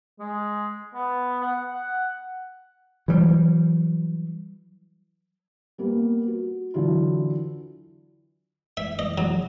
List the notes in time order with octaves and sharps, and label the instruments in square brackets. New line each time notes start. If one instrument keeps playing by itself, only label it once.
[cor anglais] G#3
B3
F#5
F#5
[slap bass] E3 F#3 G3
[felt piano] G3 A#3 B3
F#4
D3 E3 F#3 E4 F4
[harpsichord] E5
D#5
F#3